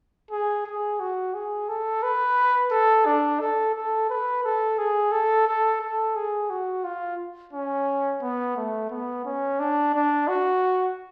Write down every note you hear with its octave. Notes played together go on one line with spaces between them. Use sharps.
G#4
G#4
F#4
G#4
A4
B4
A4
D4
A4
A4
B4
A4
G#4
A4
A4
A4
G#4
F#4
F4
C#4
B3
A3
B3
C#4
D4
D4
F#4